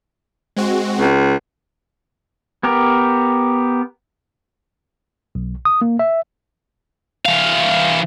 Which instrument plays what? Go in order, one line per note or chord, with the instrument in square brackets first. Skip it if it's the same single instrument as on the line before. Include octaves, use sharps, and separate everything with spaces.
[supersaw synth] G#3 C4 F#4
[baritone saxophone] C#2
[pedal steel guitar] B3 G4 A#4
[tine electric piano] B1
D#6
A#3
E5
[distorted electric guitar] E3 F5